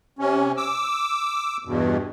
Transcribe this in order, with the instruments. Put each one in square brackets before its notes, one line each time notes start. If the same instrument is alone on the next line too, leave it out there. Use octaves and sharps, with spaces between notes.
[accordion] C3 C#4
D6 E6
E2 G2 B2